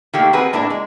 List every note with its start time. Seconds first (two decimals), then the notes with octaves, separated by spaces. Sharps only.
0.13 D#3 A3 A#3 G4
0.33 C4 F#4 G#4 A#4 B4
0.53 A2 A#3 D4 E4 A#4
0.70 G#3